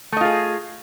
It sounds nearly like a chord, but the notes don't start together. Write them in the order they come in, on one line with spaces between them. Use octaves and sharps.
A3 D#5 F4 G#4